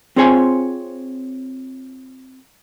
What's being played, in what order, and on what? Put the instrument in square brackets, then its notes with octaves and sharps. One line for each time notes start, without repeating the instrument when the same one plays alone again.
[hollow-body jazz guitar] C4 F4 G#4 C5 C#5 G#5